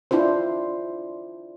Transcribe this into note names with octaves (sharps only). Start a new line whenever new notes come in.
D4 E4 F4 C5